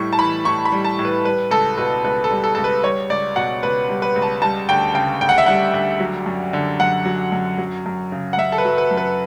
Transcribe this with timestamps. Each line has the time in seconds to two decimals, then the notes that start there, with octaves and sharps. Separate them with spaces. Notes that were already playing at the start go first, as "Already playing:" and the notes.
Already playing: A2 G3 C#6
0.13 A5
0.18 E3 B5
0.45 A2 C#6
0.65 B5
0.72 G3
0.85 A5
0.99 A2
1.05 B4
1.24 G3 B4
1.51 C#2 A4
1.78 B2 B4
2.04 C#2 B4
2.24 A4
2.31 G3
2.44 A4
2.55 C#2 A4
2.64 B4
2.83 G3 C#5
3.10 C#2 D5
3.36 B2 F#5
3.63 C#2 B4
3.89 G3
4.02 B4
4.16 C#2
4.22 A5
4.42 G3 A5
4.69 D2 G5
4.94 C#3 G5
5.21 D2 G5
5.29 F#5
5.38 E5
5.46 G3 F#5
5.74 D2
6.00 F#3
6.26 F#2
6.53 D3
6.80 F#2 F#5
7.05 F#3
7.32 F#2
7.58 F#3
7.86 F#2
8.12 C#3
8.33 F#5
8.38 F#2 E5
8.52 A4
8.58 B4
8.65 F#3
8.78 B4
8.91 F#2
8.97 B4